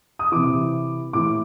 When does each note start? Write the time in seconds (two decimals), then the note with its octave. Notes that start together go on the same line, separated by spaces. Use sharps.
0.19 D#6
0.32 C3 E3 D6
1.13 A2 E3 D6